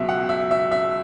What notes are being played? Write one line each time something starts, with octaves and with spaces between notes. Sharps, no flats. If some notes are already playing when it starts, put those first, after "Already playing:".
Already playing: C#2 B2 F#3 E5
F#5
E5
E5
E5